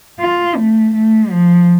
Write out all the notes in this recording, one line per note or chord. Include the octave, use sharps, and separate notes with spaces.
F4
A3
A3
F3